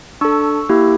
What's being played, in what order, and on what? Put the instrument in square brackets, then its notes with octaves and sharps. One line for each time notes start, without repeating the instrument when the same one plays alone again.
[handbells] D4 A4 C#6 E6
A#3 E4 G4